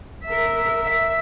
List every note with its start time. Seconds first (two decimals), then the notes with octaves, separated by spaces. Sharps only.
0.25 A#4 E5
0.85 E5